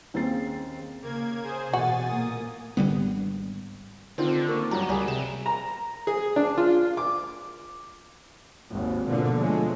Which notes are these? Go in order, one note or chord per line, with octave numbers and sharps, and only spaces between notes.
D#2 C4 C#4 G#4 A6 C7
C#3 A#3 G#6
G#4 C5
A1 B2 F#4 G#5 A6
A#2 A#3 D#6
G#1 D3 G3 B3
D3 D#3 C4 F4
A#3 C#6
F#2 G3 F#4 A#5
C#2 G3 G#4
C3 E7
A#5
G#4
D4
F4
D6
G#1 D#2 G#2
B2 D3 F3 A#3
B2 F3 F#3 G#3 A3